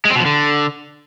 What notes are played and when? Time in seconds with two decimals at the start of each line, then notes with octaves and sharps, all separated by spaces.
0.05 G#3
0.10 C4
0.15 B2
0.20 F3
0.25 D3